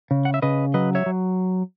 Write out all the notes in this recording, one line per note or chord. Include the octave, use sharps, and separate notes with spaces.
C#3
F#5
E5
C#3 B4 D#5
F#3 B4 D#5
C#5 E5
F#3